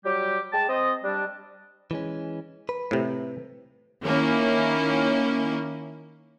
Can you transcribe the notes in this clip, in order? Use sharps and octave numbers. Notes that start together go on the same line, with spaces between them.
F#3 G3 G4
G#3 G5 A5
C4 C5 D#5
G3 D4
E3 G#3 C#4
B4
A2 C3
D#3 A#3 C#4 E4